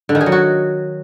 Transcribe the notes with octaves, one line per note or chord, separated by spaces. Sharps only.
D3
D#3
G#4
F#3
F#4